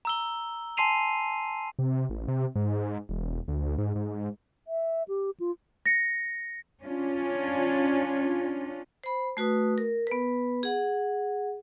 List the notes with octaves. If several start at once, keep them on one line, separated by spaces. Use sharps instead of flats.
A#5 E6 G7
G#5 A5 C6 C7 D#7 F7
C3
A1
C3
G#2
E1
D2
G#2
G#2
E5
G4
F4
A#6 C#7
C#4 D4 F4
C5 B5
A3 F#4 B4 D#6
A#4
B3 B4
G#4 F#5